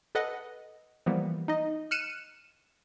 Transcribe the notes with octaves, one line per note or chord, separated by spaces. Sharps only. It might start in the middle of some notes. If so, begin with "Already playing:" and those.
A4 B4 D#5 F#5
E3 F3 G3 A#3 B3
D#4 D#5
F6 F#6 C#7 D#7 E7